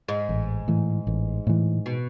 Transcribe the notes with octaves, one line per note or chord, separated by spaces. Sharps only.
G#2
A1
A2 E3
A1
A2 E3
B2